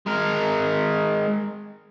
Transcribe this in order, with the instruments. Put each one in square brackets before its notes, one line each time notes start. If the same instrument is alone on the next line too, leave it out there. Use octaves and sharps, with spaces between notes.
[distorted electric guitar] G#3 A#4